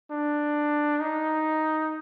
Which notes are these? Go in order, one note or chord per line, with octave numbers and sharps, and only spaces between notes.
D4
D#4